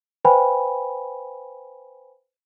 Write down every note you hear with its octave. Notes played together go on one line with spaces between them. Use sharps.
B4 C5 F5 G5 G#5 B5